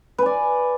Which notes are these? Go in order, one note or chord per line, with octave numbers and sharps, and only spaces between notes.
B4 D5 G#5